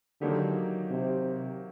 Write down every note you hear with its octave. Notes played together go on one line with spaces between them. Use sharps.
D3 D#3 F#3 A#3 D#4 G4
C3